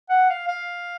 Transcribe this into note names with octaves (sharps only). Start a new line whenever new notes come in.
F#5
F5
F5